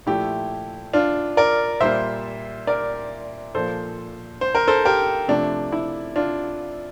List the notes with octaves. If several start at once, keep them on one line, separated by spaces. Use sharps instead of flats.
A#2 F3 A3 E4 G4
D4 F4
A#4 D5
A#2 G3 A#3 C5 E5
A#4 D5
A#2 F3 A#3 A4 C5
C5
A#4
A4 C5
G4 A#4
C3 F3 A3 D4
E4
D4 F4